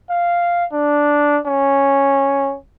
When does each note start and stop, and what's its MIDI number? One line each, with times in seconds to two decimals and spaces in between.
0.10 0.65 77
0.72 1.39 62
1.47 2.56 61